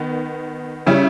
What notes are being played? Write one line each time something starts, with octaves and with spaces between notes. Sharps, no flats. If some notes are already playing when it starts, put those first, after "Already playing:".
Already playing: D#3 B3
C#3 G3 C#4 E4